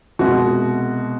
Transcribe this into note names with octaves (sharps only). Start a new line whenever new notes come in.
C2 B2 G#3 F#4